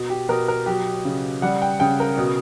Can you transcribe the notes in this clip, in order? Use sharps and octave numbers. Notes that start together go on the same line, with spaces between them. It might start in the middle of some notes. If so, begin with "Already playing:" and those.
Already playing: B2
G4
B2 A#4
A#4
F#3 G4
C#3
G3 F#5
G5
C#3 G5
A#4
B2